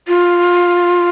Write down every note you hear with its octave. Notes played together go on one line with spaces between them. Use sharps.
F4